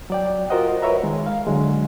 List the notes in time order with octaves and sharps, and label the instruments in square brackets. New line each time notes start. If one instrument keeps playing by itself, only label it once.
[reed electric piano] F#3 D5 G5
F4 F#4 A#4 C5 D#5 F#5
A#4 B4 C#5 E5 A#5
D#3 G#3
F5
D3 F#3 G#3